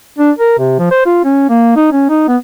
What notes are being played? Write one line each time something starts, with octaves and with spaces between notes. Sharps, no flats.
D4
A#4
C3
F3
C5
F4
C#4
A#3
D#4
C#4
D#4
B3